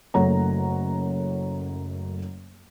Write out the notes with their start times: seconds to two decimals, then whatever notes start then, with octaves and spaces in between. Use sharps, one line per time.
0.14 F#1 F#2 A3 C#5 F#5 A#5